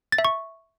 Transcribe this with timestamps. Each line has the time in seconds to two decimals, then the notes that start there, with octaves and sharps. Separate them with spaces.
0.12 A6
0.18 E5
0.25 C#6